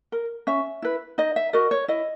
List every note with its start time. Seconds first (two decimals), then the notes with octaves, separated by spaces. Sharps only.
0.12 A#4
0.47 C#4 E5
0.82 E4 B4
1.18 D#4 D#5
1.36 E5
1.53 F#4 A#4 D#5
1.71 C#5
1.88 E4 D#5